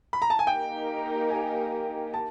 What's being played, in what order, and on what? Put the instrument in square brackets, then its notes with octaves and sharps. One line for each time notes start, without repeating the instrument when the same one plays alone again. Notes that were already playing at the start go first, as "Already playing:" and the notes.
[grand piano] B5
A#5
A5
G#5
[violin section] A#3 D#4 G4 A#4 [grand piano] G5
[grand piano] G#5
A5